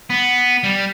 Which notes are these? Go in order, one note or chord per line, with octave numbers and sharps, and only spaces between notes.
B3
G3